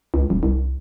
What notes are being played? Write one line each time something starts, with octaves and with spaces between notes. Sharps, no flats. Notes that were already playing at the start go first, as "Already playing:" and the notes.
C#2
D#1
C2